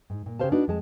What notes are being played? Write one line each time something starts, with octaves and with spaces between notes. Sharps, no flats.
G#2
A#2
C#3 G4 B4 C5 F5 A5
D4 D#4 F#4 B4
F2 G#3 A5